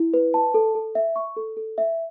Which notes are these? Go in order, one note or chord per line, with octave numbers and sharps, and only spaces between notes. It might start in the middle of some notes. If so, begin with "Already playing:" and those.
Already playing: E4
B4
A5
A4
A4
E5
C#6
A4
A4
E5